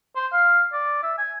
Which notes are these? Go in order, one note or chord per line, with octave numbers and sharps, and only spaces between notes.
C5
F5
D5
E5
G#5